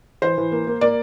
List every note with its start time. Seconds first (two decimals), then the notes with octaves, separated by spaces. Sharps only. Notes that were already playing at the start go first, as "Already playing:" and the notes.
0.22 E3 C5
0.38 E3
0.52 A#3
0.67 A#3
0.81 A#3 D5